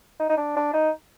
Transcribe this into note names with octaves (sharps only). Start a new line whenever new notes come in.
D#4
D#4
D4
D4
D#4